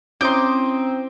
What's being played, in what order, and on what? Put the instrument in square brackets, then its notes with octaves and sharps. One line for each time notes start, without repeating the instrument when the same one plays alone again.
[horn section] C4 [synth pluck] C#4 E4 [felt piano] A#5 D#6 G6 [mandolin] C6 D6